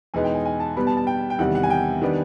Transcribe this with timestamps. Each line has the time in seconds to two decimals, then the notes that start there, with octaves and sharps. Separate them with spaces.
0.14 E2 B2 G#3 B3 D#4 G#5
0.24 G5
0.35 G#5
0.45 G#5
0.60 A5
0.76 B2 G3 B3 B5
0.87 A5
0.97 A5
1.07 G5
1.30 G5
1.39 E2 C3 D#3 G3 F#5
1.55 F#5
1.63 G#5
1.70 G5
2.02 D#3 G3 B3 D4